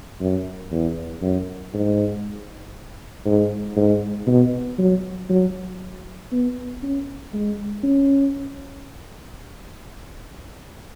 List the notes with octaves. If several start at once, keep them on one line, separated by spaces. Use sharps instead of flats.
F#2
E2
F#2
G#2
G#2
G#2
B2
F#3
F#3
B3
C#4
G#3
C#4